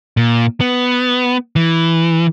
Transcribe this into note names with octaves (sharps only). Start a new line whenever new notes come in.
A#2
B3
E3